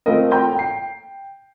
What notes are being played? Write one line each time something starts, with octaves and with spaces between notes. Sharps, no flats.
A3 C4 F4 A4 A#4 D#5
G5 A#5 G6
G5 C7